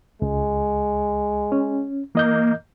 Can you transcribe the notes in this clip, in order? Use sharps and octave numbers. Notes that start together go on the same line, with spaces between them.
C#2 G#3
C#4
E3 A#3 D#5 G6